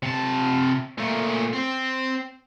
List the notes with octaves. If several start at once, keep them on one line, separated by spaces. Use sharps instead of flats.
C3 A5
A#2 A3
C4